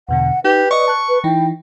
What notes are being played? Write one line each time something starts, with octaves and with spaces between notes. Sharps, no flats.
E2 B2 D3 F#5
D#4 G4 B4
D5 D#5 C#6
A5 F#6
B4
E3 D#4 E4 G5